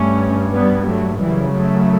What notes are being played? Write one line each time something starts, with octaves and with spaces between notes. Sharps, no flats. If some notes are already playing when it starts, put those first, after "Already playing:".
Already playing: G2 A3 C#4
G3 B3
F#3 A3
F#2 C#3 E3 G3
F#3 A3